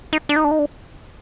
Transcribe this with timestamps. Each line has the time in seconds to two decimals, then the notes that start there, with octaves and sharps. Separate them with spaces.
0.13 D#4
0.29 D4
0.36 D#4
0.44 D4
0.51 D#4
0.59 D4